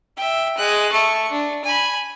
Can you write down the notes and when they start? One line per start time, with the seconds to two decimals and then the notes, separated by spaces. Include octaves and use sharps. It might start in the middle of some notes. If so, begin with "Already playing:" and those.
0.17 E5 G5
0.58 G#3 F#6
0.92 A3 C#6
1.31 D4
1.64 G#5 B5